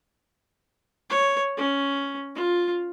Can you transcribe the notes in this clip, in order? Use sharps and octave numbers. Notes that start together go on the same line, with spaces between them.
C#5
C#4
F4